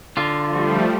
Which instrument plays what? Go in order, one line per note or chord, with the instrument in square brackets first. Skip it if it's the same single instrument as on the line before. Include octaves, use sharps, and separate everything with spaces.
[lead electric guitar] D3 F4
[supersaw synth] F3 G3 A3